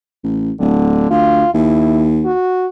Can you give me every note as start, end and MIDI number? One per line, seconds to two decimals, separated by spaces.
0.24 0.51 33
0.60 1.06 26
0.60 1.07 50
1.10 1.44 38
1.10 1.53 65
1.54 2.30 39
1.54 2.09 64
2.25 2.67 66